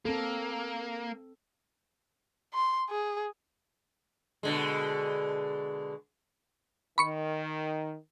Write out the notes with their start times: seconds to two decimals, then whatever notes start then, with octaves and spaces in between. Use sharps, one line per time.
0.05 A#3 C4 A4
2.54 C6
2.89 G#4
4.43 B2 D3 G#3
6.98 D#3 B5 C#6 C#7